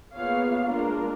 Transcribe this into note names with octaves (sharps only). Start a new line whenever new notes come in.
A#3 B3 F4 G#4 C#5 F5
G#3 A#3 D4 F4 A#4